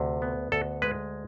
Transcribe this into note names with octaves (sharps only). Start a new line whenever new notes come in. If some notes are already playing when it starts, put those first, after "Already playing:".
Already playing: D2 C3
B3
D2 A4
G#3 B4